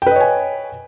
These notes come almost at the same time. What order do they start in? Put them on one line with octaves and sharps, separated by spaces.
G5 B4 D#5 C#5 G#5